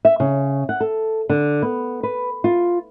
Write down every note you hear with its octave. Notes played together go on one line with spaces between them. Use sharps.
E5
C#3
F#5
A4
D3
B3
B4
F4